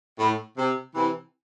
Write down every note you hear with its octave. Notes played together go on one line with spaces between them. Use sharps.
A2
C3
C3 E3